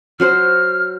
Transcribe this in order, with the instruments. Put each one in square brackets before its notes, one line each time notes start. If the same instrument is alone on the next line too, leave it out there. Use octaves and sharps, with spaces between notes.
[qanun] F#3 F#4 C5 [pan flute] F6